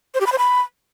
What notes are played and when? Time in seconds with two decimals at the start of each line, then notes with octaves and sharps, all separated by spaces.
0.15 C5
0.20 G4
0.26 B5
0.32 C5
0.38 B5